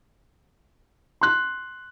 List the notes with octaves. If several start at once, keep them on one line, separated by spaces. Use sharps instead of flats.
C6 F#6